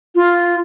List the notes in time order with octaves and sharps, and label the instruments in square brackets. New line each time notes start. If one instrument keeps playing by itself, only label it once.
[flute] F4